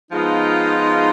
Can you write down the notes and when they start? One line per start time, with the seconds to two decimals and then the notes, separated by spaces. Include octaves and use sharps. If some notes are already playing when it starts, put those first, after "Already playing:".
0.11 F3 G#3 B3 D#4 F4